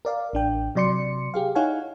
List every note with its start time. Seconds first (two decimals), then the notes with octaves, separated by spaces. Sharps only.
0.05 A#4 D5 F5
0.33 A1 D4 G5
0.75 C3 F#3 D5 C6 C#7
1.34 G4 G#4 F5
1.55 D#4 E4 C#5 F5 F#5 G#5